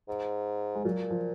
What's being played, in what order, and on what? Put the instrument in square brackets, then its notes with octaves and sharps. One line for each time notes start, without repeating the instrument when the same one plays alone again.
[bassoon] G#2
[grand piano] G#3
[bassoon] A#2 [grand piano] F#3
[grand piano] F3